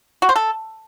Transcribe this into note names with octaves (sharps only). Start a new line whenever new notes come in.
F#4
C5
A4